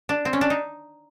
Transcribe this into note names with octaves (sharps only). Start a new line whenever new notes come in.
D4
C4
C#4
D4
D#4